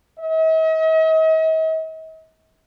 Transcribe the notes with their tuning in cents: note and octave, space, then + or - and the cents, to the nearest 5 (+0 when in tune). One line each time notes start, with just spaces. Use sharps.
D#5 +45